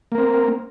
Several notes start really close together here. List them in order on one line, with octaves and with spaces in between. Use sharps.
A#3 A#4 C4